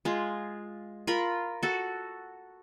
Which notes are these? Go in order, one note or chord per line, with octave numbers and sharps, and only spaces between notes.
G#3 F4
F4 A#4 B5
F#4 A4